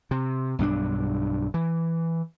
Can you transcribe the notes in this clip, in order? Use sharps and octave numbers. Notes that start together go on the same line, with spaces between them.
C3
B1 G2 G3 D4
E3